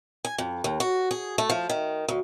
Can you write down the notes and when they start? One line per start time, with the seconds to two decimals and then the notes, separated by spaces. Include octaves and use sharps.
0.25 G#5
0.38 F2
0.64 D#2
0.80 F#4
1.11 G#4
1.38 A3
1.50 F3
1.70 D#3
2.08 D2